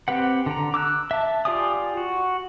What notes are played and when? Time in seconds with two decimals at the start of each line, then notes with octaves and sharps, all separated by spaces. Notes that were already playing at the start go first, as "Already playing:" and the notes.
0.08 C4 G4 B4 F#5
0.46 D3 A#5
0.74 D6 E6 F#6
1.11 E5 A5
1.45 F4 G4 D5 G#5 D#6
1.97 F#4